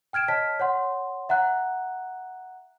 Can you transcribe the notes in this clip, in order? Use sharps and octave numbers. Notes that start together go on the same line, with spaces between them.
G5 F6 G#6 D7 E7
C#5 D#5 A5 F6 B6
C#5 F#5 C6
E5 F#5 A#5 F#6